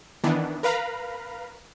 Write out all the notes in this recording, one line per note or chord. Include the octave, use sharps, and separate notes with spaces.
D#3 E3 B3 D4
A#4 B4 F5 A#5 B5